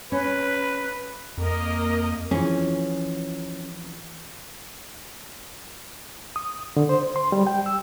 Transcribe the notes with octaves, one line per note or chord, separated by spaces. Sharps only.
C#4 B4
F2 A#3 A#4 D#5
E3 F3 C#4 G#4
D#6
D3
C5
C6
G3
G5
E6